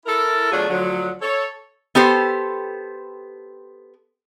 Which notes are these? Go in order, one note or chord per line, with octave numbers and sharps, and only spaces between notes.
E4 A4 A#4
B2 F#3 A3 D4 F4 G#4
D2 D3 F3 F#3
A4 C#5
B3 G4 A4 C5